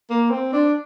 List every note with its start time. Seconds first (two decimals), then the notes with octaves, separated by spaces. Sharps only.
0.10 A#3
0.31 C4
0.53 D4